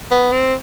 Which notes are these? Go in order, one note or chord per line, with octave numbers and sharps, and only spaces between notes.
B3
C4